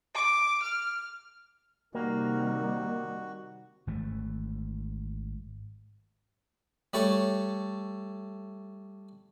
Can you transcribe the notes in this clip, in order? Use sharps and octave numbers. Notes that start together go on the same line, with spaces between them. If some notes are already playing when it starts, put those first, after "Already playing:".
D6
F6
C3 D#3 G3 A#3 F#4
G#1 E3 A3
G3 A3 A4 C#5